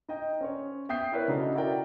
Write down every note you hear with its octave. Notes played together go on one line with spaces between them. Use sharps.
D#4 D#5 G5
C#4 C5 C#5
B3 E5 G5 D#6 G6 C7
E4 A#4 B4 C#5
C#3 D4 D#4 F#4 A4
E4 F#4 A#4 D5 G5 A#5